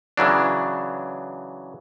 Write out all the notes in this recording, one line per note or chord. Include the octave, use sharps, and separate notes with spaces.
C#3 E3 F#3 D4